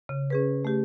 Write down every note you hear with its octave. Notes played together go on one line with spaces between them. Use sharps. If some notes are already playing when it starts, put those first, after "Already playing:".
C#3
C#4 G#4 B4
A3 G4